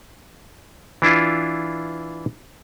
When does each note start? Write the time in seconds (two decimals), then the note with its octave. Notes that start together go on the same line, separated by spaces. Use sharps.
1.02 E3 D4 E4 F4